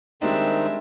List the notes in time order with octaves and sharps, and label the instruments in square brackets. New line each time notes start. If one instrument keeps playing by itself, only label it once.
[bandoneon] D#3 C4 D#4 [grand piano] G3 G#3 D4 [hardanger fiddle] E5